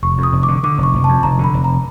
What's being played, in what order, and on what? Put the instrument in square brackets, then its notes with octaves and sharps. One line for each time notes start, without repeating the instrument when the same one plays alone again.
[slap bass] F1 [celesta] C#6
[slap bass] F2
[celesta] D#6
[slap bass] F1
[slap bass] D3 [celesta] D6
[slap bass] D3 [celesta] D6
[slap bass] F1
[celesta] C#6
[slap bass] F1
[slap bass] F2 [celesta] A5
[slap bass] F1 [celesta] A#5
[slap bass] D3
[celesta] B5
[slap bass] F1
[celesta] A#5